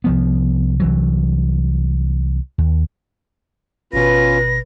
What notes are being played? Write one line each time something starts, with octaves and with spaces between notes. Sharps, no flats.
C2 F3 B3
C2 E3 F#3
D#2
G#1 B2 C#4 F4 B4 A#6